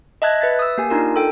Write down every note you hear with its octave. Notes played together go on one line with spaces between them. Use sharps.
D#5 E5 A5 F#6 G#6
B4 E5 A6 B6
D#6 E6
A#3 G4 G#5
D4 D#4 F4 A#4
A4 G5